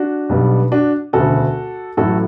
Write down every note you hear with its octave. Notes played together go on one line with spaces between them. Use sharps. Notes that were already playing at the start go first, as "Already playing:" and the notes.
Already playing: D4 F#4
B1 B2 G3 B3
D4 F#4
E1 D2 C#3 F#4 A4
A1 A2 F#3 F#4 A4